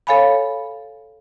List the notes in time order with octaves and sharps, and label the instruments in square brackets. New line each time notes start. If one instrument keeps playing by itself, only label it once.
[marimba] A4 C#5 F5 G#5 B5